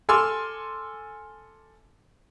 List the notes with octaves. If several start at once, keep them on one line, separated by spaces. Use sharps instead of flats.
A4 G#5 C6 D6 E6 F6